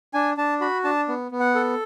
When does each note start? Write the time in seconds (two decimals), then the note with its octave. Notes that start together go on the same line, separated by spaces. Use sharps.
0.14 D4 G#5
0.37 D4 A5
0.61 F#4 B5
0.84 D4 A5
1.08 B3
1.31 B3
1.40 F#5
1.55 A4